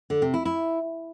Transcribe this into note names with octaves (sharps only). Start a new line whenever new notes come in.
D3
C3
E4
E4